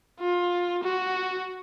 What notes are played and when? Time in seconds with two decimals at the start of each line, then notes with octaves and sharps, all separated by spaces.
0.20 F4
0.83 F#4